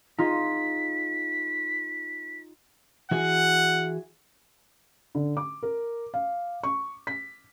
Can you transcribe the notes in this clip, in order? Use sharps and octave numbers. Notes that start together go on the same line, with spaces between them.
D#4 F4 G#4 B6
E3 F#4 G#4 F#5
D3
D6
A#4
F5
C#6
B6